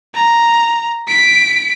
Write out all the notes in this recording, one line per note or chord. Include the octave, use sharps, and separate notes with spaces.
A#5
B6 D7